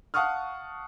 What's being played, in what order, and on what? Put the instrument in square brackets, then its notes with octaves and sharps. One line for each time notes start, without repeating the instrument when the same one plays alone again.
[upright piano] F5 F#5 A5 C#6 D#6 F6